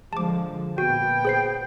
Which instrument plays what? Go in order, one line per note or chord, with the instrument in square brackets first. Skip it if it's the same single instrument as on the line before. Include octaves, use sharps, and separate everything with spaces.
[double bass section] D3 F3 G#3 [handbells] A5 D6
[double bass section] A#2 B3 [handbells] F#4 [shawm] G5
[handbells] G#4 C5 C7